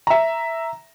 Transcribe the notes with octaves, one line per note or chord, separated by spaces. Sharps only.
E5 A#5